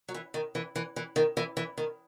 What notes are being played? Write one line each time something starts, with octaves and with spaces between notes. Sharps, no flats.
F#3
E3
D#3
E3
E3
E3
D#3
E3
E3
D#3